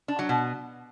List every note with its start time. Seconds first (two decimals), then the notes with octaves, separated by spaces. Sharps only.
0.08 D4
0.19 F#3
0.29 B2